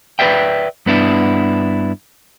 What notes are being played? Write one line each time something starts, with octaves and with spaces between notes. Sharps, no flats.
B4 C5 D5 E5 G5
G2 B3 D4 E4